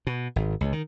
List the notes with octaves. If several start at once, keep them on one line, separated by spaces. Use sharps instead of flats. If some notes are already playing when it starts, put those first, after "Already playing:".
B2
G#1
C#2
D#3